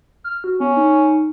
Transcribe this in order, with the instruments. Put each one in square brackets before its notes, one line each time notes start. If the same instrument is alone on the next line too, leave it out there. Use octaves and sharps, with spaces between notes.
[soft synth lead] F6
F#4
[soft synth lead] B3 [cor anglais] C#4
[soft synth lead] D#4